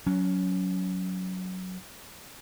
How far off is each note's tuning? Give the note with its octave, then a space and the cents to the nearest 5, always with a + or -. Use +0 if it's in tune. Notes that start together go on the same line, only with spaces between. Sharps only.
F#3 +0 C#4 +25